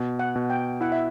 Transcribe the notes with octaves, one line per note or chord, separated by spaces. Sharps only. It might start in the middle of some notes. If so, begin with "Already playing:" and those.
Already playing: B2
F#5
B2
G5
E4 F#5
E5